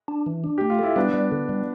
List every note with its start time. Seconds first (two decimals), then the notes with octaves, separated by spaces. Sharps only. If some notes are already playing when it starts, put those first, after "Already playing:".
0.08 D4
0.26 E3
0.44 D4
0.58 A3 G4
0.70 F4
0.79 E4 A4
0.96 G3 B3 D4
1.14 G3
1.32 D3
1.49 G3